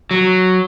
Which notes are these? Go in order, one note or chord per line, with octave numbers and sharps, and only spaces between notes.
F#3